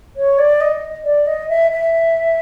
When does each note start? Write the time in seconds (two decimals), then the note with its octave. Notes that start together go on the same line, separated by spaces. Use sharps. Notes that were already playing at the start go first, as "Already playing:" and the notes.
0.16 C#5
0.38 D5
0.61 D#5
1.04 D5
1.26 D#5
1.49 E5
1.71 E5